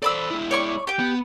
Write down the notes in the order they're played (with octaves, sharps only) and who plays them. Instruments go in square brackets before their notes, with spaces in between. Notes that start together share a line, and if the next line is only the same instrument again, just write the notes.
[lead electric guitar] A4 C5 [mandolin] D5 B5 E6
[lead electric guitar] G#3 E4
[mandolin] C#5 D5 C#6
G4 G5
[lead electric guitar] B3